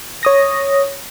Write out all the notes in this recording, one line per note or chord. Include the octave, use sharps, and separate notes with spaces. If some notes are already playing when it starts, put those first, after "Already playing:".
C#5 D#6 A#6